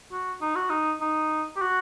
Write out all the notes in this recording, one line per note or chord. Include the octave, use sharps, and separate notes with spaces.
F#4
D#4
F#4
D#4
D#4
G4
F#4